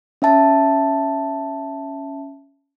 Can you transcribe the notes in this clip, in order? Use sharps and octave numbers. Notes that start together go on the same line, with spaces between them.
C#4 E5 A5